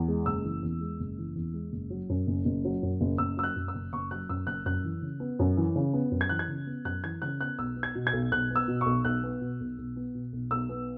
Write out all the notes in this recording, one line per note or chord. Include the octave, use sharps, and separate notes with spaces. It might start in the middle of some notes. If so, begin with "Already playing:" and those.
Already playing: E2
G#3
F#1 E6
E3
E2
G#3
F#1
E3
E2
G#3
F#1
F#3
F#2
F#1
F#1
F#3
F#2
F#1
F#1 E6
F#3 E6
F#6
F#2
E6
F#1
F#1 C#6
F#3 F#6
F#2 E6
F#1 F#6
F#2 F#6
E3
C#3
B3
F#2
E3
C#3
B3
F#2
G#6
E3 F#6
G#6
C#3
B3
F#2 F#6
E3 G#6
C#3 F#6
B3 F#6
B1 E6
B3
G#6
B2
G#6
B1
B1 F#6
B3
E6
B2
C#6
B1
B1 F#6
B3
B2
B1
B1
B3
B2
B1
B1 E6
B3